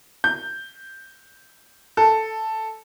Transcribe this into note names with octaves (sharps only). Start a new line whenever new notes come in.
G6
A4